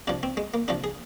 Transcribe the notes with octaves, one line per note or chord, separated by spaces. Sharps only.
C3 F3 D4
C4
G#3
A#3
C3 F3 D4
G#4